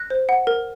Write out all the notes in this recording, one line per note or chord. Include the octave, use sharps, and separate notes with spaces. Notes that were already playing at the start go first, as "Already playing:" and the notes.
Already playing: F#6 A#6
C5
F#5
A#4